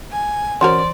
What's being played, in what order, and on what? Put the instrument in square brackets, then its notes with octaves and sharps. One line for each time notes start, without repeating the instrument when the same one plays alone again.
[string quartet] G#5
[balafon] E3 C5 [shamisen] C#4 F#4 A#4 [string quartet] D5 [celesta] C6